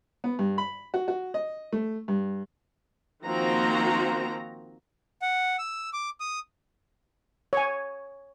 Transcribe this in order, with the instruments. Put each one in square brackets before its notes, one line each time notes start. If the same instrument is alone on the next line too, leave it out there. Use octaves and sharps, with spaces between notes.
[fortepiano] B3
G2
B5
F#4
F#4
D#5
A3
G2
[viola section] D#3 F3 A#3 C4 F#4 A#5
[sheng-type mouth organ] F#5
E6
D6
D#6
[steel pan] C#5 G#5